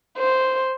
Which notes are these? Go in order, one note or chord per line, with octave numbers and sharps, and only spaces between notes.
C5